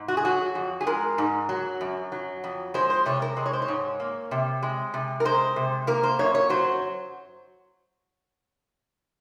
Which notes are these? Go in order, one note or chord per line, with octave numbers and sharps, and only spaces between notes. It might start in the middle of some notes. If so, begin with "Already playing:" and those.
Already playing: G#2
F#4
G#4
F#3 F#4
F2
G#4
G#3 A#4
G#2
F#3
F#2
F#3
F2
G#3 C5
C5
C3 C#5
A#4
G#3
C#5
C5
C#5
G#2
A#3
C3
G#3
C3
A#4
G#3 C5
C3
A#3 A#4
C5
F#2 C#5
C#5
F#3 C5